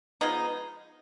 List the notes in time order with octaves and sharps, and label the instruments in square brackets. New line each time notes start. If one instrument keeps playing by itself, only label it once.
[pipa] F3 G#3 B3 D#4